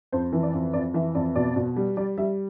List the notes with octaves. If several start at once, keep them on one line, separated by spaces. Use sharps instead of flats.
F2 C5
E3
D5
F2
F2 D5
E3 E5
F2 D5
B2 D5
B2
G3
G3 D5
G3 E5